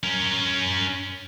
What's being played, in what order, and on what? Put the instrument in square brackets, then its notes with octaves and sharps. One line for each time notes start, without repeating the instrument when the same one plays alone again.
[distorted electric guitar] C#4 A#4